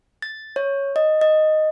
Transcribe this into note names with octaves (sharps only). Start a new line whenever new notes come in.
A6
C#5
D#5
D#5